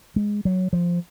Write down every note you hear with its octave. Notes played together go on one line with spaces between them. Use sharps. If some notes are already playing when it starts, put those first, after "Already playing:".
G#3
F#3
F3